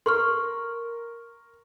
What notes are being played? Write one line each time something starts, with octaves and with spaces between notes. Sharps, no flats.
A#4 C6 C#6 F6